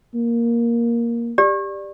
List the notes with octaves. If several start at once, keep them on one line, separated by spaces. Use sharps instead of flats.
A#3
G4 D5